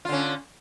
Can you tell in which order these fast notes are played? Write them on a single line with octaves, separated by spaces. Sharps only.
F4 D3 C#4